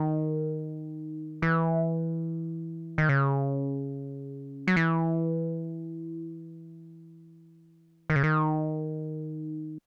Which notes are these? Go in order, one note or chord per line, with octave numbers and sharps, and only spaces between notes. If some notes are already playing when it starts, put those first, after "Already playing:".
Already playing: D#3
E3
D#3
C#3
F#3
E3
D#3
C#3
D#3